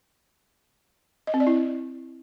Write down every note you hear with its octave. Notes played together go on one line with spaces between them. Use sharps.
D#5
C4
D5
E4